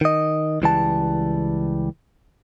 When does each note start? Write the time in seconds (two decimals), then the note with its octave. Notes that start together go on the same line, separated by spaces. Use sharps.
0.01 D#3 D#5
0.62 C#2 E3 G3 A5